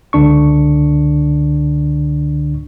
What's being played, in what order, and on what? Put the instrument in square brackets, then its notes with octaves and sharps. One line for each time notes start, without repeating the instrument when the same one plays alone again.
[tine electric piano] C#2 D3 D4 C#6